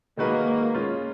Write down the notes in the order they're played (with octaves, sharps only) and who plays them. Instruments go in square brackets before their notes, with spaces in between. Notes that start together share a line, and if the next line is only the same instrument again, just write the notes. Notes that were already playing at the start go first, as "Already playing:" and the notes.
[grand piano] D#3 G#3 D#4 F#4 B4 [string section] A#3
[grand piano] G#3 C#4 F4